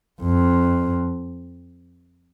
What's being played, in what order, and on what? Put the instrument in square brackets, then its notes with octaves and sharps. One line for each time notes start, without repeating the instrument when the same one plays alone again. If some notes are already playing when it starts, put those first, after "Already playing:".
[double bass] F2